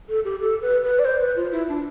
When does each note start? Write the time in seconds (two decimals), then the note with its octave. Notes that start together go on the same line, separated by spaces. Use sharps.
0.09 A4
0.25 G4
0.40 A4
0.62 B4
0.84 B4
0.99 D5
1.05 C5
1.21 B4
1.36 F4
1.52 E4
1.69 D4